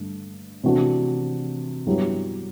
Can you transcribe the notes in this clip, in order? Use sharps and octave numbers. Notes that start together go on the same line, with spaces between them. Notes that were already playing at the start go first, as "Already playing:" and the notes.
Already playing: G2 D3 A3
C3 E3 A3 D4 F#4
G2 F#3 B3 E4 G4